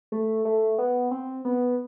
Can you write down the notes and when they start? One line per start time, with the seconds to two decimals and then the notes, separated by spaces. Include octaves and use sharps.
0.12 A3
0.45 A3
0.78 B3
1.11 C4
1.45 B3